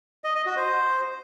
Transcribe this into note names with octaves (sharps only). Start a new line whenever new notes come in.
D#5
D#5
F#4
C5